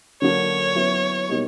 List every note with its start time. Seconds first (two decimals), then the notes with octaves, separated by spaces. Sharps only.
0.22 D3 F#3 A#3 D4 C#5
0.75 F#3 B3 E4
1.29 B2 G3 A#3 D#4